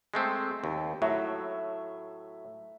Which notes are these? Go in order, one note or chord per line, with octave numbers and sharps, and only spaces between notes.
G#3 A3 C4
D#2
A2 F#3 E5